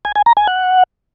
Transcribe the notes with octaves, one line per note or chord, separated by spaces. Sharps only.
G#5
G#5
A#5
G#5
F#5